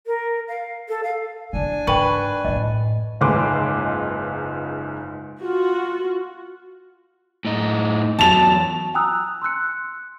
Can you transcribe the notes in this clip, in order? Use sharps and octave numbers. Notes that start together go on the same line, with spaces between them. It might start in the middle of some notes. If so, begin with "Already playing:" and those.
A#4
F5
A4
F5
C#3 E3 D4 G#5
G#2 B4 G5 B5 C#6
F#2 A2 D#5
F#1 C#2 G#2 B4 C6 D6
F4 F#4
A2 D#4
E2 F#3 A5 F7
G5 G#5 A#5 D#6 E6 F#6
C6 E6 F#6 C#7